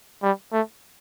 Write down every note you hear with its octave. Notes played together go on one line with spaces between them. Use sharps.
G3
A3